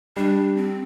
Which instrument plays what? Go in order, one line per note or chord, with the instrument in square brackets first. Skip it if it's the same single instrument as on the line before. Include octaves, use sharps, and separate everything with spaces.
[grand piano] G3 [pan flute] D4
[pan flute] C4